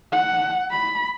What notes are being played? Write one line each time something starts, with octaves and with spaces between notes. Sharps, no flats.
F#5
B5